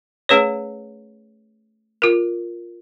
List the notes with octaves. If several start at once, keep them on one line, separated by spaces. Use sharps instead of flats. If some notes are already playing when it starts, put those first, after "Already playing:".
A3 C#4 G#4 B4 C#5
F4 A#4